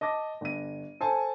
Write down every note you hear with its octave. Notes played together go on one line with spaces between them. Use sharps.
D#5 A5 D6 A#6
G1 D#7
A4 C5 G#5 A5